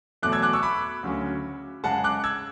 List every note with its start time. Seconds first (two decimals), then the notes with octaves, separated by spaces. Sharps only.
0.22 E2 B2 F#3 A3 D6 F#6
0.32 E6 G#6
0.42 D6 F#6
0.53 C#6 E6
0.63 B5 D6
1.03 D2 C#3 F#3 C#4
1.84 F#2 C#3 G#3 F#5 A5
2.04 D6 F#6
2.24 E6 G#6